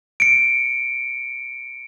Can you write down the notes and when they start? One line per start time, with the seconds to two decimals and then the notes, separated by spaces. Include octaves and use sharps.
0.20 C#7 D7